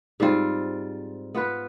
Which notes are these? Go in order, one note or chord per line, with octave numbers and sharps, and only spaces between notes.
G#2 G3 C4 F4
B3 F4 B4